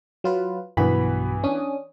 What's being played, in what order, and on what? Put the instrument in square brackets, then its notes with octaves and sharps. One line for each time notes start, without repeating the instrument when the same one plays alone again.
[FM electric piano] F#3 F4 B4
[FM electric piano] B1 F#4 B5 [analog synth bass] G2 [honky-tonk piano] E3 B3
[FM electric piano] C#4 D4 D#6